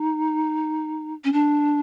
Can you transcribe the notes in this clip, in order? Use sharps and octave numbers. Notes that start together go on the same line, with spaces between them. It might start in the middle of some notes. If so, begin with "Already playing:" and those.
Already playing: D#4
C#4
D4